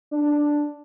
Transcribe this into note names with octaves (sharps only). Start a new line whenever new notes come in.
D4
D4
D4